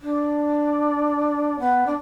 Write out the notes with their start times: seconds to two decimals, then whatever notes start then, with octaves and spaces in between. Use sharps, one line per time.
0.01 D4
1.59 B3
1.86 D4